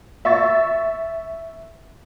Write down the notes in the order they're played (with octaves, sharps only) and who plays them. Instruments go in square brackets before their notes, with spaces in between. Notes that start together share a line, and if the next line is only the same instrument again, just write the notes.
[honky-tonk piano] E5 C#6 A6